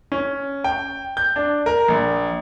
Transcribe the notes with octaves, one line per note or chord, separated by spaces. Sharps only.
C#4
G5
G6
D4
A#4
A#1